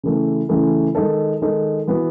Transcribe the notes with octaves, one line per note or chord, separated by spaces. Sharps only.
C#3 E3 A3
C#3 E3 A3
D#3 G#3 D#4 A4
D#3 G#3 D#4 A4
E3 B3 F#4